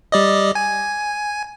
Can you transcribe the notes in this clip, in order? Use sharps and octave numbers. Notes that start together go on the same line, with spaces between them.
G3 D5 D#5
G#5